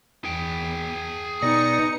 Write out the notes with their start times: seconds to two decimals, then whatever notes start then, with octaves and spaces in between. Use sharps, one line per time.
0.25 E2 G#4 G5
1.42 B2 D#4 B4 D5 D#6 A#6 C#7